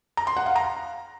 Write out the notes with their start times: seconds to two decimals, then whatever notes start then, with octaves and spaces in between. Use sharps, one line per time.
0.17 A#5
0.27 C6
0.37 F#5
0.46 F5
0.56 A#5